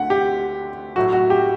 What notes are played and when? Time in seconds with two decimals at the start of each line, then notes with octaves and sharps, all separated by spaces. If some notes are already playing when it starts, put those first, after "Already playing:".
Already playing: D2 D3 A3 F#5
0.10 G4
0.96 A2 F#3 A3 F#4
1.13 F#4
1.30 G4